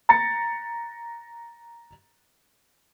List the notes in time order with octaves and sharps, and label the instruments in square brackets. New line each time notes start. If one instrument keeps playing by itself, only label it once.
[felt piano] A#5 A6 C#7